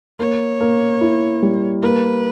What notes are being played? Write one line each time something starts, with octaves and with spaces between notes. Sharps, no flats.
A#3 C#5
A#3
E4
G3
A#3 B4